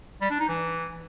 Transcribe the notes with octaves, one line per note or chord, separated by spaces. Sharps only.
G3
D4
D#4
E3